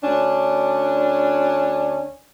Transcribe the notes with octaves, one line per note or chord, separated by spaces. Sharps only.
D2 C#4 D4